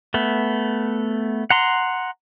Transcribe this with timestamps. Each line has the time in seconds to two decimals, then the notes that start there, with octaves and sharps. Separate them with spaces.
0.14 A3 B3
1.50 F#5 A#5 C6